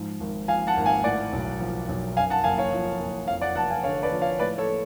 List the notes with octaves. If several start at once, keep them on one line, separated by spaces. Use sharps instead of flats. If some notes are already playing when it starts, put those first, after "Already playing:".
Already playing: G#2 F3
G#1
F3 F5 G#5
F#5 A5
G#1
F5 G#5
A2 D5 F#5
B1
F3
B1
F#2 F5 G#5
F#5 A5
F#1 F5 G#5
C#5 F5
F3
F#1
F2 C#5 F5
D5 F#5
F1 F#5 A5
F5 G#5
D3 C#5 F5
B4 D5
F3
C#5 F5
A2 B4 D5
A4 C#5